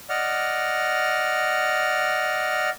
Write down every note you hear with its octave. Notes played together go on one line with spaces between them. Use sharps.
D5 D#5 F#5 F6